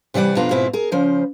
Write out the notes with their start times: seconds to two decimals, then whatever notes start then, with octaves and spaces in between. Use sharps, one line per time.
0.14 C3 E3 G3 D5 F#5
0.36 F2 B2 D4 F4 A#5
0.51 G#2 B2 C4 E4 F4
0.73 G#4 A#4
0.92 C#3 F3 C5